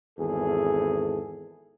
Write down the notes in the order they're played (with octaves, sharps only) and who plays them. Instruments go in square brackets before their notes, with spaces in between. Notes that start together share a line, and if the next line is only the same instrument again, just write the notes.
[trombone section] G#1 E2 G#4 A4